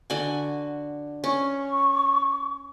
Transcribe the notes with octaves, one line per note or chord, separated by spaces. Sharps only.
D3 F#4 G#5
C#4 C#6